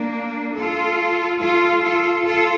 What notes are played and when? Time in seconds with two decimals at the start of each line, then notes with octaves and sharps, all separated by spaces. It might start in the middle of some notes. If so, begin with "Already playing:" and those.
Already playing: A#3 D4
0.56 F4 A4
1.40 F4 A4
1.82 F4 A4
2.24 F4 A4